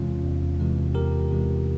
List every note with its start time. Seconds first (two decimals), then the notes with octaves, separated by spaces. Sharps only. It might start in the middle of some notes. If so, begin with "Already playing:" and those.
Already playing: E2 C3 E3 G#3 C#4 F4
0.24 E2
0.60 C3 E3 G#3
0.95 E2 G4 A#4
1.31 C3 E3 G#3